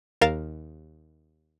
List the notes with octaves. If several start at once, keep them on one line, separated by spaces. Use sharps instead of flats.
D#2 A#4 F5 F6 A6 E7